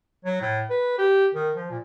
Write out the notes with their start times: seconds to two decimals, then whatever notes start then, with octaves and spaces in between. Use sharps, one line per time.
0.25 F#3
0.41 A2
0.70 B4
0.98 G4
1.35 D#3
1.56 F3
1.70 A#2